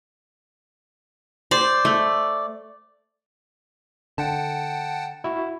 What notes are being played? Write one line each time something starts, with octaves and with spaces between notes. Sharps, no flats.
C5 D5
A3
D3 F#5 G5 A5
E4 F#4